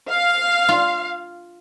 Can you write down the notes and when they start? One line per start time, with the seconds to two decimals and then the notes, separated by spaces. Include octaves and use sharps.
0.11 F5
0.69 F4